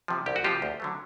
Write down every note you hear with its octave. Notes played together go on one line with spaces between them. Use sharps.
C3 F3
C2 G4
F#4
C3 F3 F4 G4
D2
D3 F#3 A3